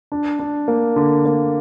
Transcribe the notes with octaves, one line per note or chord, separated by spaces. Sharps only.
D4
D4
A#3
D3
A#3